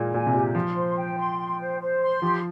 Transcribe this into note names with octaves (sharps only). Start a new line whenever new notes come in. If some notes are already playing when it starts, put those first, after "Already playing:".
Already playing: A#2 G#3 A#3
A#2 G#5
C3
A#2 G4
F3 C6
C5
G5
C6
G5
C5
C5
C6
F3 G4